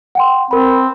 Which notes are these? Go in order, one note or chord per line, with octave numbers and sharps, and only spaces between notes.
F#5 G5 C6
C4 A#4 B5